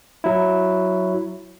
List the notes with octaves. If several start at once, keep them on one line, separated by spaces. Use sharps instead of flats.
F#3 E4